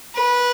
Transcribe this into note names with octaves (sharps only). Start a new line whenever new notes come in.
B4